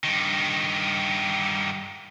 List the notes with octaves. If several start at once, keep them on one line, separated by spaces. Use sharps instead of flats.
G2 D#3